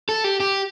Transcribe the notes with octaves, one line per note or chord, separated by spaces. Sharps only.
A4
G4
G4